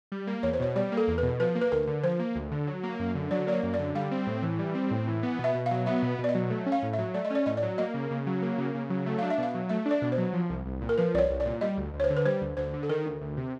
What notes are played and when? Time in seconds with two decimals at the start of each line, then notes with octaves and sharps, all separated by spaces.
0.12 G3
0.27 A#3
0.43 E2 C#5
0.53 C5
0.60 B2 C#5
0.76 G3 D5
0.92 A#3
0.97 A4
1.08 E2
1.18 B4
1.23 B2
1.40 F3 B4
1.55 A#3
1.62 B4
1.72 D2 A#4
1.87 D3
2.04 F3 C5
2.19 A#3
2.35 D2
2.52 D3
2.67 F#3
2.83 A#3
2.99 F#2
3.15 D3
3.31 F#3 D5
3.47 A#3 D5
3.52 C#5
3.63 F#2
3.74 D5
3.79 D3
3.95 G3 F5
4.11 C4
4.27 A2
4.42 E3
4.59 G3
4.75 C4
4.91 A2
5.07 E3
5.23 B3
5.39 B2
5.44 E5
5.55 B2
5.66 F#3 F5
5.86 B3 E5
6.03 B2
6.19 B2
6.24 D5
6.29 D#5
6.35 F#3
6.50 A3
6.66 C#4
6.72 F5
6.83 A2
6.93 E5
6.98 F#3
7.14 A3 D5
7.25 D#5
7.30 C#4 D5
7.46 A2 D#5
7.57 D5
7.63 F#3
7.78 A#3 D#5
7.94 C#3
8.11 C#3
8.27 F#3
8.42 A#3
8.58 C#3
8.75 C#3
8.90 F#3
9.06 A3
9.18 D4 F5
9.30 E5
9.38 B2
9.43 F5
9.55 F#3
9.69 A3 E5
9.86 D4
9.91 D5
10.02 B2
10.12 C5
10.18 F#3
10.33 F3
10.50 C2
10.66 C2
10.82 A#2
10.89 A#4
10.98 F3 B4
11.14 C2 D5
11.18 C#5
11.30 C2
11.40 D5
11.46 A#2
11.61 G3 D#5
11.77 D2
11.94 D2
12.00 C#5
12.04 C5
12.10 D3
12.17 B4
12.26 G3 C5
12.42 D2
12.57 D2 C5
12.73 D3
12.83 A4
12.89 D#3 A#4
13.06 D2
13.21 D2
13.37 C3